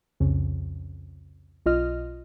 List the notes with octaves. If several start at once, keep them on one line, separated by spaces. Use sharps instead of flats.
C2 F2 C#3
B1 F4 D#5 F6